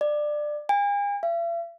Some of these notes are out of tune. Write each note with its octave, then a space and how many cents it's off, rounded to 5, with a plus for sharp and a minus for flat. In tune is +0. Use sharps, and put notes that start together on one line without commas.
D5 +20
G#5 -45
E5 +45